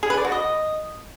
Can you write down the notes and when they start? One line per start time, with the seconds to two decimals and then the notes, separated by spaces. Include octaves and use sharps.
0.03 G#4
0.10 B4
0.17 D5
0.25 F#4
0.32 D#5